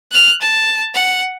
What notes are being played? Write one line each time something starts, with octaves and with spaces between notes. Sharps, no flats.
F6 F#6
A5
F#5